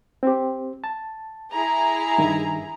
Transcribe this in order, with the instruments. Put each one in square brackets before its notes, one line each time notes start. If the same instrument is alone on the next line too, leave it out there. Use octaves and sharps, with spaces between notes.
[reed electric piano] C4 G4
A5
[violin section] E4 G#4 A#5
[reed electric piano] G2 D#3